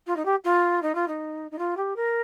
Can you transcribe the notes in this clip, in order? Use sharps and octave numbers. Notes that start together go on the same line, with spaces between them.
F4
D#4
G4
F4
D#4
F4
D#4
D#4
F4
G4
A#4